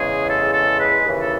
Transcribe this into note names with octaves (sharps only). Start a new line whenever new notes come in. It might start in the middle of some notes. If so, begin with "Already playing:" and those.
Already playing: E2 C#3 G#3 G#4
A4
A4
B4
D#2 C#3 E3
A4